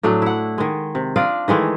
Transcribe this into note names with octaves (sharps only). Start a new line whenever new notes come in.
A2 F#3 A3 D4
E4 F#5
D#3 G#3
C3
D4 F4 D5 D#5
D#3 E3 G#3 A3